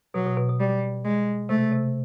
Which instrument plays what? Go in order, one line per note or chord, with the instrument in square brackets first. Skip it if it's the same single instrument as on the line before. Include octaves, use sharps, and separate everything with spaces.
[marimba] B2 [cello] F#3
[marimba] B2
B2
B2
[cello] G3
G#3
[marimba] C3 [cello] A3
[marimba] C3